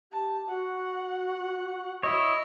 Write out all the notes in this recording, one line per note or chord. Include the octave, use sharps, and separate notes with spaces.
G4 A5
F#4 F#5
E4 C#5 D#5 E6